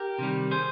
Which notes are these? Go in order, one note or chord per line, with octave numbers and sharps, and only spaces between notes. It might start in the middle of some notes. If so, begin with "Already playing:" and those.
Already playing: G4 A#4
C3 D#3 G3
G#4 C5